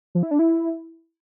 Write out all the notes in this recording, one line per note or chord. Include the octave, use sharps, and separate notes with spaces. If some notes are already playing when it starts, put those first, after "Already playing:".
F3
E4
D4
E4